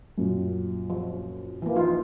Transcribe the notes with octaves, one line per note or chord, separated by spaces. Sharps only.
F#2 A#2
F3
E3 A#3
F3 D#4 F4